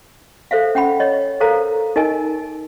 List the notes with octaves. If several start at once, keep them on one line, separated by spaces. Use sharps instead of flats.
A4 C5 E5 F5
C#4 F#5 G5 B5
C#5 D#5
A4 A#4 C5 F5 A#5
D#4 A#4 D#5 G#5